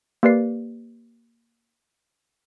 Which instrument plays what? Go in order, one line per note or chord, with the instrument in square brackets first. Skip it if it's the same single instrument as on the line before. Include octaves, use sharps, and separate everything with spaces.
[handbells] A#3 G4 B4 D5 C7